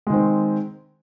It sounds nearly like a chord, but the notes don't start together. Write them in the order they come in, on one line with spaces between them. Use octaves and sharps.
G#3 D#3 C4